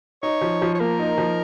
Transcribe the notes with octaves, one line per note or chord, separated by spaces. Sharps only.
D#4 C#5
F3
F3
C#5
A#3 A#4
D#4
F3